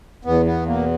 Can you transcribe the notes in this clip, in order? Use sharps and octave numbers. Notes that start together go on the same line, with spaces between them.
E2 B3
B3
B2 A#3